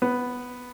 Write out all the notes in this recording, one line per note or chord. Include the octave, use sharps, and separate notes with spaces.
B3